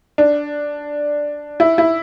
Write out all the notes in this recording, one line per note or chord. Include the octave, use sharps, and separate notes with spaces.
D4
E4
E4